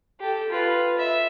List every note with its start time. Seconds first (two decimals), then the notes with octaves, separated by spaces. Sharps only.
0.20 G4 A4
0.50 F4 B4
0.97 E5